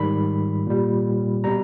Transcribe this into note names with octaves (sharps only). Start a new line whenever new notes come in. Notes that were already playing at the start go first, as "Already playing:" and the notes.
Already playing: G#2 D#3 G3 B5
A#2 G3
B2 G3 A#5